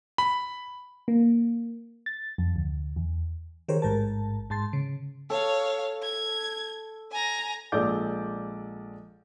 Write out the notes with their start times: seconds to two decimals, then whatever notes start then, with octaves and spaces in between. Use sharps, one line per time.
0.18 B5
1.08 A#3
2.06 A6
2.38 F2
2.56 D2
2.96 E2
3.68 D#3 G4 G#4 A#4 C5 C#5
3.82 A1 G#2 A#4 A5
4.50 G#2 A5 C6 A6
4.73 C#3
5.30 A4 C#5 F5
6.03 G#6
7.11 G#5 A#5
7.72 A#1 G#3 A4 D5 D6 G6